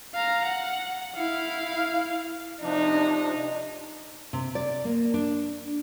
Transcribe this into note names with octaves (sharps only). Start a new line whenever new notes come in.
F5 A#5
F#5
E4 F5
C3 F3 D4 D#4
C3
D5
A#3
D4